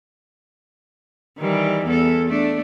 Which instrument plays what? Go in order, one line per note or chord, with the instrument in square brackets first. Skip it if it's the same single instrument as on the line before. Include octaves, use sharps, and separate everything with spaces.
[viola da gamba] D#3 E3 G3
E2 A4
A3 D4